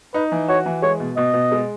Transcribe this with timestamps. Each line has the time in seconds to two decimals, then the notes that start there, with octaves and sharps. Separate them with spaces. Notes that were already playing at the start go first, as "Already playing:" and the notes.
0.14 D#4 B4
0.32 E3
0.48 F#4 C#5
0.66 E3
0.82 G#3 C#5
1.00 B2
1.17 B2 D#5
1.33 B2
1.52 G#3